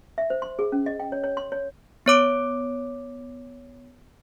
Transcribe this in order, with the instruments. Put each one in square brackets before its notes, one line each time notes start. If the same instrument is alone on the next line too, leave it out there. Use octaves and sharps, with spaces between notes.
[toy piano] E5
C5
C6
G#4
C#4
D#5
G5
C#5
C#5
C6
C#5
[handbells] B3 C#5 D6 D7